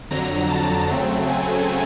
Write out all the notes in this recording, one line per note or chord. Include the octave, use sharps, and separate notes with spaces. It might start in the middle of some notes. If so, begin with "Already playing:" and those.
F2 D3 F#3 A#5
A5
C#3 F#3 A3 C4
G#5